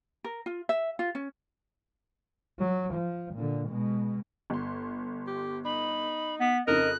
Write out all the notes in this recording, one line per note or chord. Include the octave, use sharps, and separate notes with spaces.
A#4
F4
E5
F4
C#4
F#3
F3
A#2 D3
B2 G#3
G1 C6
G4
D#4 B5
B3 B6
F2 C#3 D#4 A#4 D#5 F#6